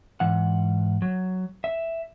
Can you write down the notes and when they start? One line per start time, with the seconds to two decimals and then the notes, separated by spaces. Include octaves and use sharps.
0.20 G#2 E3 F#5
1.02 F#3
1.64 E5